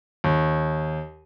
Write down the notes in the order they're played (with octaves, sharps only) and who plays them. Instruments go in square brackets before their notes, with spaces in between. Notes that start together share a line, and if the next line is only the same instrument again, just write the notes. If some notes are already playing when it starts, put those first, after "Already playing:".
[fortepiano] D#2